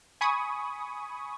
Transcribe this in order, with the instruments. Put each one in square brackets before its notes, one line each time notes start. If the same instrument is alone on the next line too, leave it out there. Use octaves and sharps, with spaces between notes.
[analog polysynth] G#5 B5 C#6 D#6